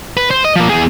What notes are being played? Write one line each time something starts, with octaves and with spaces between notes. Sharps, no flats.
B4
C5
D#5
F3 A#3
E2 G#4